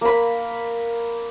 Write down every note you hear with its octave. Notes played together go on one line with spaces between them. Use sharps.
A#3 B5